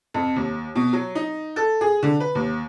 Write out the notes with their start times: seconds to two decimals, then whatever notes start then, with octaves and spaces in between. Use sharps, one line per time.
0.14 F2
0.36 D#2
0.75 B2
0.93 F#3
1.15 D#4
1.56 A4
1.81 G#4
2.03 D3
2.20 B4
2.35 D#2